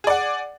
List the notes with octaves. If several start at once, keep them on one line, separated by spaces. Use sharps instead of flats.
G#4 D5 F#5